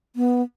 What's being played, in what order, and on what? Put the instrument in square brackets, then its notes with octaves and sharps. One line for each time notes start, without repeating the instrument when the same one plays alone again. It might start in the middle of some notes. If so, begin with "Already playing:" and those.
[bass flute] B3